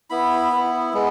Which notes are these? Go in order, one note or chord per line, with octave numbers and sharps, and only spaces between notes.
B3 E4 B5
B3 E4
G#3 B3